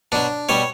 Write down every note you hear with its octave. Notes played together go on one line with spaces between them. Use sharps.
B2 F#3 D4
B2 G3 C#5